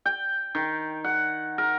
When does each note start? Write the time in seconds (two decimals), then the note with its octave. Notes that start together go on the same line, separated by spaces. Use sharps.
0.05 G5
0.55 D#3
1.04 F#5
1.58 A#4